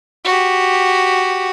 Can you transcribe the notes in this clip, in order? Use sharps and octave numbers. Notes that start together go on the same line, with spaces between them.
F#4 G4